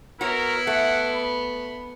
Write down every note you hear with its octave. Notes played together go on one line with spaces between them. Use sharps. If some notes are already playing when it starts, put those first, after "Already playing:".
B3 E4 F#4 A#4 C#5
A3 F#5
B5